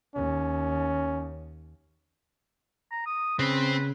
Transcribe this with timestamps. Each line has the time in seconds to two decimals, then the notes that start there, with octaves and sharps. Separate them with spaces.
0.15 D#2 C#4
2.91 A#5
3.06 D#6
3.39 C#3 C4 B4